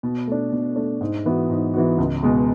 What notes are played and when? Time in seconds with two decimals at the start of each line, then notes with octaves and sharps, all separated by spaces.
0.03 B2
0.27 A3 D4
0.52 B2
0.76 A3 D4
1.01 G#2
1.25 E3 B3 F#4
1.50 G#2
1.74 E3 B3 F#4
1.98 C#2
2.23 B2 G#3